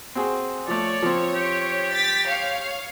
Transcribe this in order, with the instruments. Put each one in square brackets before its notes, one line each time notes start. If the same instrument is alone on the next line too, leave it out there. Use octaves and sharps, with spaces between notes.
[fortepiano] C4 F#4 G#4
[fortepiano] F3 A3 [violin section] C#5 [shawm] D5
[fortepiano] F3 C4
[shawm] G4
[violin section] A6 B6
C#5 F5